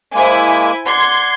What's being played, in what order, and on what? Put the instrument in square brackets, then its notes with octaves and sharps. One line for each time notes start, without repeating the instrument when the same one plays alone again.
[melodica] G#3 A#3 D6 [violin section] E4 C5 G#5
[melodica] D5 F#5 [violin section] C6 G#6